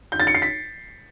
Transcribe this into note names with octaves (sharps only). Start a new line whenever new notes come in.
G6
A6
C#7
C7
B6